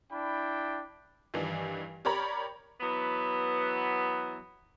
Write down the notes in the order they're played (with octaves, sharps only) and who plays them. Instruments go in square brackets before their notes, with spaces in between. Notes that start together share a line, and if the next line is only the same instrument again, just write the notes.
[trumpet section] D4 E4 G5 B5
[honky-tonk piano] G2 D#3 E3 D4
G4 A#4 C#5 D5 A#5 B5
[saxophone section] E3 F#3 B3